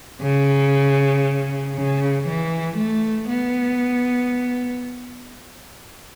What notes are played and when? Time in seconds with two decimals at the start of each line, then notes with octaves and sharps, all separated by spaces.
0.22 C#3
1.76 C#3
2.28 E3
2.78 A3
3.30 B3